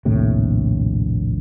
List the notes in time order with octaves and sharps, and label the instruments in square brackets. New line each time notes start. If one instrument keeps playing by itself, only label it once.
[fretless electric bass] A#1 D#2 A2 C3